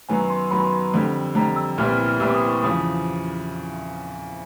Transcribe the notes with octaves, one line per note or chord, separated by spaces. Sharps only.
F#2 D#3 F#3 B3 G#5
C6
F#2 D#3 F#3 B3 B5
C6
B5
F2 D3 G3
F2 D3 G3 A#5
E6
C2 A#2 G3 B3 E4 F6
F6
F6
C2 A#2 G3 B3 E4 E6
D6
D#6
C#6
E2 C#3 F3 D#6